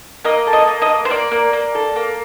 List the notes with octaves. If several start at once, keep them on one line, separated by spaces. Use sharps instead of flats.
A#3 D#5
A4
D#5
A#3
D#5
A#3
C5
A#3 D5
A#3
A#3
A4
A#3